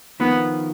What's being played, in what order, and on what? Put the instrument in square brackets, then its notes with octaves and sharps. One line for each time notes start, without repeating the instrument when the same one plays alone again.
[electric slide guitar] D#3 F3 [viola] B3